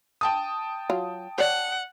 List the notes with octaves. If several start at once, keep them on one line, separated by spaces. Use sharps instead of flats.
G5 A5 D#6
F#3 F4
C#5 D5 F#5